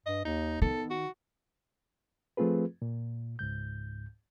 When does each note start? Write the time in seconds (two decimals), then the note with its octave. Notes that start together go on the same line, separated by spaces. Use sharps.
0.06 G2 D#5
0.25 D#2 D#4
0.62 D#3 B3 A4
0.90 F#4
2.37 F3 A3 C4 F4 G#4 B4
2.82 A#2
3.39 C#2 G#2 G6